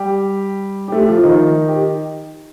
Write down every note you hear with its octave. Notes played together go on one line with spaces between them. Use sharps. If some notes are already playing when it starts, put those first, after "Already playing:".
Already playing: G3 G4
G4
A3 A4
F3 F4
F4
D#3 D#4
G4